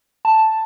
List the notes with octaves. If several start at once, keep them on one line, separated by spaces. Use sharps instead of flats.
A5